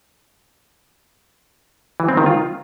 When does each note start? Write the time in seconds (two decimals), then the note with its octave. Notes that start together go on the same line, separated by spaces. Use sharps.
2.00 E3
2.09 C4
2.17 D#3
2.26 F4